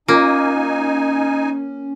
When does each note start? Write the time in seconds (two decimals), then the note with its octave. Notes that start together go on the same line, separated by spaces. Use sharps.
0.08 A#3 C#4 D#4 F4 G#5